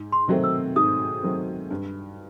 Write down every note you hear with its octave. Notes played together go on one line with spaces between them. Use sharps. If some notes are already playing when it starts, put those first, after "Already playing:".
Already playing: G#2
C6
D#3 F#3 A3 C4
E6
G#2 D#6
D#3 F#3 A3 C4
G2